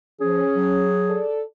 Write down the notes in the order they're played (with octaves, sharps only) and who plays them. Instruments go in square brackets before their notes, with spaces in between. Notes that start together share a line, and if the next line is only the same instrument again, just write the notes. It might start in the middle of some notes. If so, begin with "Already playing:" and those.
[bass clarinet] F3 [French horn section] C#4 [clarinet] G#4
[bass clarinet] F#3
[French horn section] A4 D5